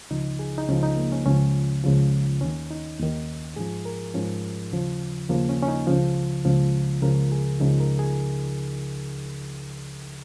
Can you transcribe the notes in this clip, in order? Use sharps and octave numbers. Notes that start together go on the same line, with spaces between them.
C#2 C#3 F3 D#4
G#4
D#4
C#2 C#3 F3 C#4
D#4
A#3
C#4
C#2 C#3 F3 C#4
C#2 C#3 F3
D#2 D#3 C#4
D#4
D#2 D#3
G#2 F3 G#4
A#4
G#2 F3 C#4
D#2 C#3 F3
D#2 C#3 F3 A#3
C#4
C#4
D#4
C#2 C#3 F3
C#2 C#3 F3
C#2 C#3 F3 A#4
G#4
C#2 C#3 F3 D#4
A#4
G#4